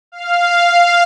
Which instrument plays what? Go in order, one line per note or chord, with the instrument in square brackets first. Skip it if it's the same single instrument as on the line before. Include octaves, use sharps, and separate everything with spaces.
[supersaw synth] F5